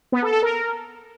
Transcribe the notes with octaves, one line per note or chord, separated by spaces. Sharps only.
B3
A4
A4
A#4